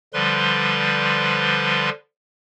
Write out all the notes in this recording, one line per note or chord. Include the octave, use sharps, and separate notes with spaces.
D3 F3 G3 B4 C6